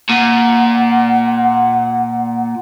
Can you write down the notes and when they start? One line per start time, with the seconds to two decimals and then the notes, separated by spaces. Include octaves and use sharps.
0.10 A#2 F#5